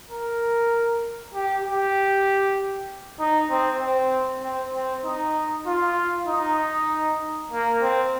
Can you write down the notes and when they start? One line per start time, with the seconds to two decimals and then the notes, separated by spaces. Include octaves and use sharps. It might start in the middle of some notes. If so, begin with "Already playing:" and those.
0.11 A#4
1.34 G4
1.65 G4
3.19 D#4
3.50 C4
3.80 C4
4.42 C4
4.74 C4
5.05 D#4
5.66 F4
6.27 D#4
7.51 A#3
7.81 C4